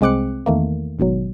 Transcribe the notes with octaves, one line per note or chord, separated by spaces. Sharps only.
C2 G#3 C4 D6 F#6 C#7
E2 D#3 A3 A#3
G#1 G#2 B2 F#3